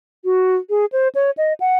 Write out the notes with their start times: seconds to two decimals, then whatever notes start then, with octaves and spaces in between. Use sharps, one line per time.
0.24 F#4
0.70 G#4
0.92 C5
1.15 C#5
1.37 D#5
1.60 F#5